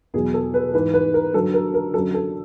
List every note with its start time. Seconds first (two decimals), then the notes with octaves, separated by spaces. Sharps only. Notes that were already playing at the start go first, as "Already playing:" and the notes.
0.14 E2 B2 F#3 G#4
0.34 A4
0.54 B4
0.74 G#2 E3 B4
0.94 B4
1.14 A#4
1.34 G2 D3 F#3 A4
1.54 A#4
1.74 A#4
1.94 F#2 D3 F#3 A4
2.14 A4